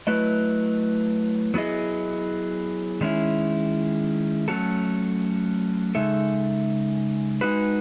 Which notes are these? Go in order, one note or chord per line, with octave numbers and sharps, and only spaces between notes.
F#3 A3 E4 B4 D#5
F#3 B3 E4 G#4 D#5
D#3 G#3 C#4 E4
F#3 A3 C#4 F#4 A4
C#3 G#3 D#4 A4 E5
G#3 D#4 F#4 B4